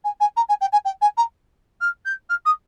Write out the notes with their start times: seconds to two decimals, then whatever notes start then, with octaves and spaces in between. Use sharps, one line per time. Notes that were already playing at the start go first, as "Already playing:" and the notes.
0.04 G#5
0.20 G#5
0.37 A#5
0.49 G#5
0.61 G5
0.72 G#5
0.85 G5
1.01 G#5
1.17 A#5
1.81 F6
2.05 G6
2.29 F6
2.45 D#6